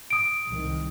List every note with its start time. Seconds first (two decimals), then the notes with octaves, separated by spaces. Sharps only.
0.10 D#6 D7
0.47 C2 D#3